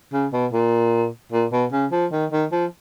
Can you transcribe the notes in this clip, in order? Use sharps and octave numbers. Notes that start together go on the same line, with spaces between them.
C#3
B2
A#2
A#2
B2
C#3
F3
D#3
D#3
F3